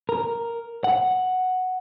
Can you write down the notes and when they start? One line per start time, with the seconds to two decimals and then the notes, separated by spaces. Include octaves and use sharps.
0.09 A#4
0.84 F#5